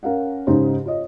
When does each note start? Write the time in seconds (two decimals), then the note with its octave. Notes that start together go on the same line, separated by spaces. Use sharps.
0.03 C#4 A#4 F5 F#5
0.47 G#2 C#3 D#4 G4 C5
0.86 F4 C#5 D#5